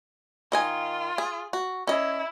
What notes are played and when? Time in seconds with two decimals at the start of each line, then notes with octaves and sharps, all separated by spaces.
0.52 D#3 F4 D#5 G#5
1.18 G#4
1.53 F#4
1.87 C#4 E4 D#5